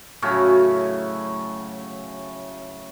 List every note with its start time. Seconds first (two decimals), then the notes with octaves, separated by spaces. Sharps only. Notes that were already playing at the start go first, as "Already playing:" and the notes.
0.22 A2 C#3 F#3 C#4